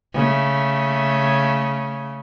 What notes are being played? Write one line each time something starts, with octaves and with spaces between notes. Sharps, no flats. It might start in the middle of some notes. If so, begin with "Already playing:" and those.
C#3 A3